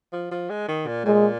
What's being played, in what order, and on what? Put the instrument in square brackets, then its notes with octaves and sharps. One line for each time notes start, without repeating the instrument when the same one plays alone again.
[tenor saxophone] F3
F3
G#3
D#3
A#2
[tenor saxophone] A#2 [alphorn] G#3